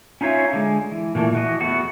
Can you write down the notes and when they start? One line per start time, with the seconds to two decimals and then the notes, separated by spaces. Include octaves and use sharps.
0.21 C#4 D#4 F4 C#5 E5
0.53 D3 G#3
0.91 E3
1.15 A#2 E3 A3
1.33 E3 F#4 D#5
1.61 E2 A3 B3 F#4